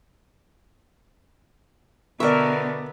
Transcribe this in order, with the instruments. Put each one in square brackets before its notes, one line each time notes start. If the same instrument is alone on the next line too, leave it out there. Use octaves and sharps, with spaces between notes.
[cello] B2 D3 [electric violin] B3 [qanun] A#4 E5 [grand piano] D5 C#6